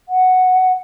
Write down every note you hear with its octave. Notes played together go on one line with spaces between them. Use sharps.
F#5